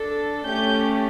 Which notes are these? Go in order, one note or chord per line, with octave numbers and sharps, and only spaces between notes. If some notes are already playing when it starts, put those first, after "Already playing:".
Already playing: D4 A4
A3 C#4 G4 G6